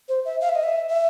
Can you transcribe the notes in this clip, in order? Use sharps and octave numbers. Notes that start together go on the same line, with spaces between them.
C5
E5
F5
E5
D#5
E5
E5